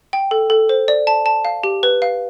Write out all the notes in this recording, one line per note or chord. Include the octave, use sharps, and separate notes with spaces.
G5
A4
A4
C5
D5
A5
A5
F5
G4
B4
F5